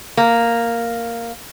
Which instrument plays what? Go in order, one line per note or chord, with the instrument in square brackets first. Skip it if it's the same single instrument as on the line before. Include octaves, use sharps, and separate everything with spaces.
[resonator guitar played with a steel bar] A#3